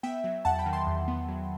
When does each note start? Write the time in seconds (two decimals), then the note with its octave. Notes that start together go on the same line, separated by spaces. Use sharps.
0.03 B3 E5 G5
0.24 F#3
0.45 E2 F#5 A5
0.59 G5 B5
0.66 D#3
0.73 A5 C6
0.87 E2
1.08 B3
1.28 F#3